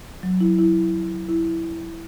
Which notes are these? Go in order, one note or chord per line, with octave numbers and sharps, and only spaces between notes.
F#3
E4
E4
E4